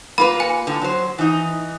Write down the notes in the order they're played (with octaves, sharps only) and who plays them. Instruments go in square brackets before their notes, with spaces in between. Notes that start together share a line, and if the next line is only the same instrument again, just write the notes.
[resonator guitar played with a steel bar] A#3 F4 B4 [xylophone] B5
[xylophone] G#5
[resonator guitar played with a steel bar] A2 D3
F#3 C5
E3 D#4